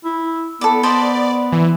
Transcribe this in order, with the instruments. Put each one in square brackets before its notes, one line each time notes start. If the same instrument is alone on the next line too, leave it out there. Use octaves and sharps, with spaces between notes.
[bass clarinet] E4
[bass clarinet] B3 [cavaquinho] A4 D5
[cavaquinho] C5 D#5 B5 [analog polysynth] D5
[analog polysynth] E3